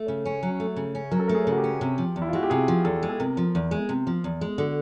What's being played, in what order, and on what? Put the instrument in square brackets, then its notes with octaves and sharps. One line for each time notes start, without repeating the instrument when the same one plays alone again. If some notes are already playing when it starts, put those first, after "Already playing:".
Already playing: [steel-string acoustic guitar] A3
C#3
C#4
F#3
A3
C#3
C#4
[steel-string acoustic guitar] F#3 [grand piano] A#4
[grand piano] A4
[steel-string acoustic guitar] A3 [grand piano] A#4
[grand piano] G#4
[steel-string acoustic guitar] C#3 [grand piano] F#4
[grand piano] G4
[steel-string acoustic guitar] C#4
C3
F3
E2
[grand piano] E4
F4
[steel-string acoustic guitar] G#3 [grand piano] F#4
[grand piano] G4
[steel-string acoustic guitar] C3 [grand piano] G#4
[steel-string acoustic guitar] F3
[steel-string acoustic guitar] E2 [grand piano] A4
[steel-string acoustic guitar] G#3
[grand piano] A4
[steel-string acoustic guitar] C3 [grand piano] A#4
[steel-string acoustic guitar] F3
E2
G#3
C3
F3
E2
G#3
[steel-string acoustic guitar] D3 [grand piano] F#4